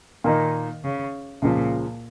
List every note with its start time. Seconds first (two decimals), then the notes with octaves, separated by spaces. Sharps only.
0.24 A#2 D#3 A#3 D#4
0.84 C#3
1.42 C#2 A#2 C#3 F3